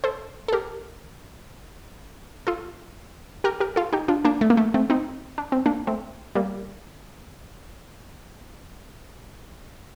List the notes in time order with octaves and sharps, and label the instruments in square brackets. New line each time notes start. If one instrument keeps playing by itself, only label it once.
[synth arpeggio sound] A4 C5
A4
G4 A#4
F4 A4
G4 A#4
G4 A#4
F4 A4
D#4 G4
D4 F4
A#3 D4
A3
A#3
A3
A3 C4
C4 D#4
D4
C4
A#3 D4
A3 C4
G3 A#3